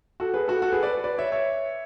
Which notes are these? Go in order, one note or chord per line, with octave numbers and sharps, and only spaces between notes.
F#4 A4
G#4 B4
F#4 A4
F#4 A4
G#4 B4
B4 D5
B4 D5
C#5 E5
C#5 E5